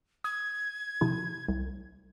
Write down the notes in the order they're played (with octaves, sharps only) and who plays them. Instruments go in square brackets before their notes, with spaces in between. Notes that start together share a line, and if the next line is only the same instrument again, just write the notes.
[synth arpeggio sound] D#6 [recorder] G#6
[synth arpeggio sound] C3 F3 E4
C2